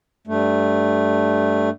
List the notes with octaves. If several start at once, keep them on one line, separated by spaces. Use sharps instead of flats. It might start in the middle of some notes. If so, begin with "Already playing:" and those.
G2 A3